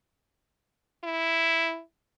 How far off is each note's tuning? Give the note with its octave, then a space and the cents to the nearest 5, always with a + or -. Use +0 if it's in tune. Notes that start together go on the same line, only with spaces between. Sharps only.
E4 +0